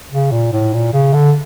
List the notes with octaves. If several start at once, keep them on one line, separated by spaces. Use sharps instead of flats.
C#3
A#2
A2
A#2
C#3
D3